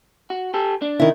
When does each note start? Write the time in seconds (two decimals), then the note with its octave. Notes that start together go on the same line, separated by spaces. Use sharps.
0.30 F#4
0.54 G4 A4
0.82 D4
1.00 D#3 E4